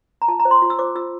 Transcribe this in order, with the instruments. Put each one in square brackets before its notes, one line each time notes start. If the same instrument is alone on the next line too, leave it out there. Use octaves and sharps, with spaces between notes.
[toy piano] A#5
F4 A5
A#5
C5
C6
F4
E6
C5 D6
F4 E6